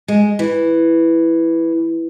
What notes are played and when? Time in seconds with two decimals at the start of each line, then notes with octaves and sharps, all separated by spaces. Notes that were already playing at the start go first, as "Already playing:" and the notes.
0.08 G#3
0.39 E3